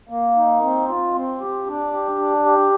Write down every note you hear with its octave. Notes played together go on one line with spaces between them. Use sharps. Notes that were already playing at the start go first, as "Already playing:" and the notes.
A#3
D#4
C4
F4
C4
G4
D4
G4
D4
G4